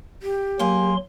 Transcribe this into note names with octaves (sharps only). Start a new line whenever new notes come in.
G4
F#3 A#3 G#4 C6